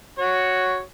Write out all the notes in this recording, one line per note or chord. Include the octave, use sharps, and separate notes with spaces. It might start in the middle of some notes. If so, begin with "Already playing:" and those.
F#4 C#5